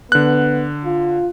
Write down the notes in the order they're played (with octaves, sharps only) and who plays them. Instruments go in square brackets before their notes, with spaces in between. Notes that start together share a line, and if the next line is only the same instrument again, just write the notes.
[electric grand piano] D3 F#6 [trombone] B3
[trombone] F4